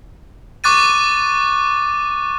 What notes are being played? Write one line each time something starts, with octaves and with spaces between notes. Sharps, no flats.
C#6 D6 F#6 A6 D#7